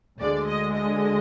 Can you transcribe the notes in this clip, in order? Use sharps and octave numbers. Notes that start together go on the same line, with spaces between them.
D2 D3 G#3 D5
D#5
D#5